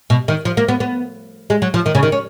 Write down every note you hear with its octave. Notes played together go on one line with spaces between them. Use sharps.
B2
D#3
F3
A#3
B3
B3
G#3
F#3
F3
D#3
C#3
D#3
C#4